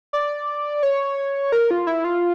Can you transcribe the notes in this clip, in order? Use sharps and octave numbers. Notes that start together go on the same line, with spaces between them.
D5
C#5
A#4
F4
E4
F4